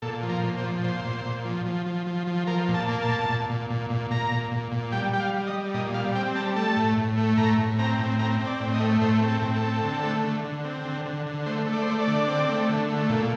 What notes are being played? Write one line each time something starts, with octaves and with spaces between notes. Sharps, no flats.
A#2 A4
F3
A#4
A#2
C5
F3
A#2 C5
A#2
A#2
F3
F3
F3
F3
F3
F3 A#4
A#2
A5
A#3
A5
A#2
A#2
A#2
A#2
A#2
A#2 A#5
A#2
A#2
A#2
G3 G5
G3 G5
F5
G3
D#5
G3
A#2 D#5
G3 F5
C4 G5
G3 A5
A3 A5
A2
A2
A3
A2 A#5
A2
C4 A#5
A2
C4 A#5
C4
D5
A2
D#5
A3
A2 C5
C4
A4
A2
A4
C4
D3
A3
D3
D3
C4
D3
D3
D3
A3 C5
A3
D5
C5
A3 D5
D5
D3
C4
A3
D3
A3
A#2